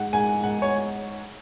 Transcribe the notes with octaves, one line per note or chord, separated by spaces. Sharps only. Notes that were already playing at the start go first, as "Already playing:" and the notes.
Already playing: G#2 F#5
G#2 G#5
G#2 F#5
C#5